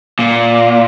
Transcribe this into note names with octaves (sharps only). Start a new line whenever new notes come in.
A#2